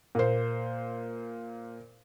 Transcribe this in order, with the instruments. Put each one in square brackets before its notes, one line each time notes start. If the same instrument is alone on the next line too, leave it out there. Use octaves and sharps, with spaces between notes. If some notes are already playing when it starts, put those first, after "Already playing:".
[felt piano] A#2 C5